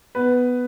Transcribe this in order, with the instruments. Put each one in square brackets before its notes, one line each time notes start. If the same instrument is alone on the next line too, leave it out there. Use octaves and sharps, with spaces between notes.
[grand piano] B3 B4